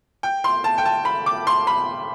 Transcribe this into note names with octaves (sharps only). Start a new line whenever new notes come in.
G5
C6
A5
G5
A5
B5
D6
C6
B5